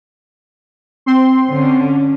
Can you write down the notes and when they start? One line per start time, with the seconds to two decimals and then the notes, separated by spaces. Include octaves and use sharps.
1.06 C4 C6
1.49 D3 C#4